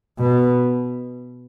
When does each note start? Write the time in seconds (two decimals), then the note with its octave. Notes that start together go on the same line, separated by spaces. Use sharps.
0.18 B2